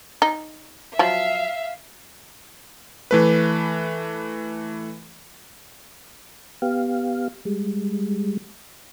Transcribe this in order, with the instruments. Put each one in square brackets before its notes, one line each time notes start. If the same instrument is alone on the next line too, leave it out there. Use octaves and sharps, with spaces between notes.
[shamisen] D#4
[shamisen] F3 F#3 [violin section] E5 F5
[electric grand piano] E3 A3 B4
[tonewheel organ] B3 G4 F5
G3 G#3